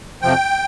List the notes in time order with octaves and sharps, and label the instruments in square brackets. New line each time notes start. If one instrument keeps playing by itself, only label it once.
[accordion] F2 C3 F3 G5